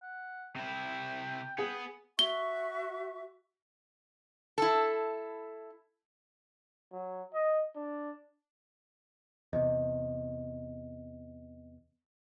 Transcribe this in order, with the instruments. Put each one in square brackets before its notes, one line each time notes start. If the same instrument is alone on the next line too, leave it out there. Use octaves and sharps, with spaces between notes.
[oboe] F#5
[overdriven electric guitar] C3 E4 [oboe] G5
[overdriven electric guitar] B3 [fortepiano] G#4
[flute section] F#4 E5 C#6 [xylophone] G7
[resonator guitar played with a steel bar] E4 A4
[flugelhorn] F#3
D#5
D4
[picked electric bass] E2 C3 [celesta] D#5